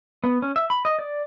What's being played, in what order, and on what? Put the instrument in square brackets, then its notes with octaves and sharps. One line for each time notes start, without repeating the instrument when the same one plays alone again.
[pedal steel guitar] B3
C#4
E5
B5
D#5
D5